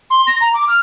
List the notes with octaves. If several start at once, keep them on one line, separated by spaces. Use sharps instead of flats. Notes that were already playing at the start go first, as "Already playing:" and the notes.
C6
A#6
A#5
D6
F6